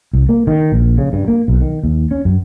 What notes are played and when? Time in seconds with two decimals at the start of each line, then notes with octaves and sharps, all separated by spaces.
0.13 C2
0.29 A#3
0.47 D#3
0.72 A#1
0.98 C#3
1.13 G2
1.28 A#3
1.48 B1
1.61 D#3
1.83 D#2
2.11 C#4
2.25 F#2